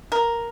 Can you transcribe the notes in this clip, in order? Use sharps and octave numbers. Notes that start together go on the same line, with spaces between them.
A#4